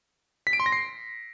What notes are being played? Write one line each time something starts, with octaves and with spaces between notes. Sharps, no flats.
B6
D7
C6
A#6
C7